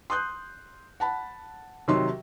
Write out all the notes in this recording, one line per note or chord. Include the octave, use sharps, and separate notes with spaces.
C6 D#6 F#6 G6
F#5 A5 B5
C3 D#3 F#3 D#4 C6